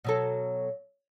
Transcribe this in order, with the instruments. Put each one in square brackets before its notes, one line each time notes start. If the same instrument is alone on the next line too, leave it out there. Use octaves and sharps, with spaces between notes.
[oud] B2 F#3 A4